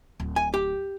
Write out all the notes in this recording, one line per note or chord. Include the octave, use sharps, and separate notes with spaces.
D1
G#5
G4